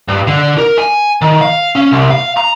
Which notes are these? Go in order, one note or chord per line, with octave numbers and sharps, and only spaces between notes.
G2
D3
A#4
G#5
D#3
F5
C#4
C2
F5
A#5